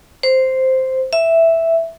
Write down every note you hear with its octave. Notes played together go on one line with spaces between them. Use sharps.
C5
E5